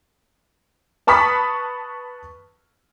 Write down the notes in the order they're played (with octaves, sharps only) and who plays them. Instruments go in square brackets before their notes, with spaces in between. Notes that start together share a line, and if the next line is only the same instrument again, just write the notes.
[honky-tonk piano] B4 A5 B5 C#6 D#6 B6